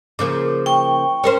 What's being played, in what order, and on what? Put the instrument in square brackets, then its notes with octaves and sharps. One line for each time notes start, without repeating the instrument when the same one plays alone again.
[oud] C#3 F3 A#3 [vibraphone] D6
[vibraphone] G5 C#6
[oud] C#4 A#4 C5